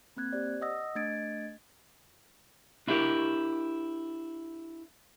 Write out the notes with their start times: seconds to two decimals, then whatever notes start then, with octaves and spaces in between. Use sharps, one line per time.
0.17 A#3 C4 F#6 G#6
0.33 G4 C5 D5
0.62 D#5 F#5 D#6 E6 A#6
0.95 A3 D4 D#5 G#6 A6 D7
2.88 D4 E4 G4 A#4